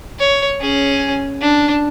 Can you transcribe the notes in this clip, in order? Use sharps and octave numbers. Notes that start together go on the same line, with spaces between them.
C#5
C#4 G#4
D4